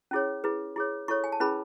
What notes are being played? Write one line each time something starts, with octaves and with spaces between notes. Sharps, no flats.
C#4 E4 G#4 C#5
E4 G#4 B4
E4 G#4 C#5
E4 A4 C#5 C#6
G#5
A5
C#4 E4 G#4 B4 B5